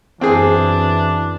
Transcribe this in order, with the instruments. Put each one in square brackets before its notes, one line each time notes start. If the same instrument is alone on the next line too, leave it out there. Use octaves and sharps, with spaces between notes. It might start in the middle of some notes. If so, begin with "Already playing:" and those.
[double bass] F#2 [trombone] E3 [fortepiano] C4 G#4 [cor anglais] D4